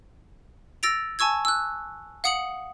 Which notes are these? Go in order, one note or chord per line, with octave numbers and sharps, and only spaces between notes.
E6 A6 A#6 D7 F7
G#5 A5 C#6 E6 G#6
E6 F#6
F5 F#5 D#6 C#7 F#7